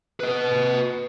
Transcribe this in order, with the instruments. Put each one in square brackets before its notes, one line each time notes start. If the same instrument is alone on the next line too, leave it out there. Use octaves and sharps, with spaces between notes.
[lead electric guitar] B4 D#5